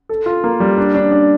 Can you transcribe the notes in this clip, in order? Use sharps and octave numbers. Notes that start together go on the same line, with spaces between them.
A4
F4
A#3
G3
D4
D4
D4